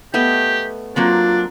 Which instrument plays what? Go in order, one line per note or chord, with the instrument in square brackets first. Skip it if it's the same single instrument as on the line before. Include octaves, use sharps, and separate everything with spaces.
[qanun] A3 B3 D#5 [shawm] G4
[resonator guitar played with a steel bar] F#3 A#3 C4 [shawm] D4 [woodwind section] F4